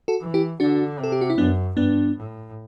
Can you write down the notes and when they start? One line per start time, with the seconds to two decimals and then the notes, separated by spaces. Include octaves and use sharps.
0.08 F#4 A4
0.21 E3
0.34 E4 G4
0.60 D3 D4 F#4
0.99 C3 A4
1.12 G4
1.21 F#4
1.30 E4
1.38 F#2 B3 D4
1.77 G2 B3 D4
2.16 A2